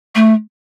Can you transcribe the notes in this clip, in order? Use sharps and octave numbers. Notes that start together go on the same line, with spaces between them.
A3